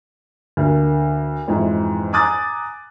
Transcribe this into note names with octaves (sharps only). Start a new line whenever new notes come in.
D2 A#3
F2 G#2 E3
G#5 A#5 D6 D#6 F#6 A6